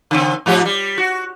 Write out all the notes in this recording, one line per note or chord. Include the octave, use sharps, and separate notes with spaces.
C#3 C4
G#2 F3 G4
G3
F#4